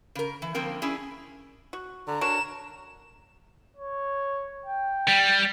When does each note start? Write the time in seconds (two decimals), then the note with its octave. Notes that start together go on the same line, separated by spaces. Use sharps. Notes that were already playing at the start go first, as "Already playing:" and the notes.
0.15 C#3 A#4
0.42 E3
0.55 D3 F3 A#3 C4 A#4
0.82 C#4 D4 E4 G#4
1.73 F#4
2.07 D3 A#5
2.21 D4 F#4 A#4 C#5 E7
3.77 C#5
4.66 G5
5.08 G3